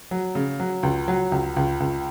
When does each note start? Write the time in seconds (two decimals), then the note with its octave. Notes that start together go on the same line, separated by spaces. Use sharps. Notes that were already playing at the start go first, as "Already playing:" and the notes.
0.11 F#3
0.35 C#3
0.60 F#3
0.83 C#2
1.08 F#3
1.32 C#2
1.56 C#2
1.80 C#2